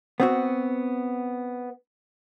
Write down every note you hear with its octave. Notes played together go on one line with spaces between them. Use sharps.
B3 C4 F#4